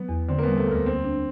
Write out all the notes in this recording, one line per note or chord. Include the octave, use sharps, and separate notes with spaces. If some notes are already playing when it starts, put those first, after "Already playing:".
Already playing: F#3 B3
E2
D3 C4
A#3
G3 B3
A3
D2 A#3
A#3 C4
D4